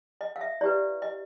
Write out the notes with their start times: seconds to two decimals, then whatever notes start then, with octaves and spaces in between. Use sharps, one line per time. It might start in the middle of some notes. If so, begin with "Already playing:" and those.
0.21 D#5
0.36 F5
0.41 E5
0.61 E4 G4 B4 D5
1.02 D#5